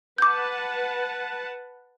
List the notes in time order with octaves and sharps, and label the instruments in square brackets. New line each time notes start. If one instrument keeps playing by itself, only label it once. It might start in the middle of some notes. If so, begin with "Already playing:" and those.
[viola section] B4 F#5 A5 [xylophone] D6 G6